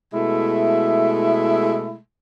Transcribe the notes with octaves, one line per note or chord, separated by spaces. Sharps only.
B2 G#3 A3 E4